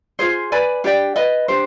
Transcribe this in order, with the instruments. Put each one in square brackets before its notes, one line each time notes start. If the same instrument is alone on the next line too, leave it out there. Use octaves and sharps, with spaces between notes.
[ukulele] F4 G#4 C5
B4 D5 G#5 B5
D4 G4 D5 G5
B4 D#5 B5
D4 G4 C5